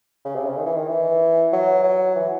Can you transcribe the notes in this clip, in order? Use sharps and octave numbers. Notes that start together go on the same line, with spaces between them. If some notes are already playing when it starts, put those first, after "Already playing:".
C#3
C3
C#3
D#3
E3
D#3
E3
F#3
F#3
E3